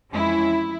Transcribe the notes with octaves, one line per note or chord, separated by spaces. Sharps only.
F2 E3 G#3 C#4 E4